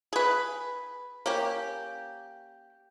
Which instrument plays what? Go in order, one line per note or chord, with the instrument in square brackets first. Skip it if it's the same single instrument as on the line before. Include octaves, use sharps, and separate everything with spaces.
[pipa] G#4 B4
A#3 C#4 G4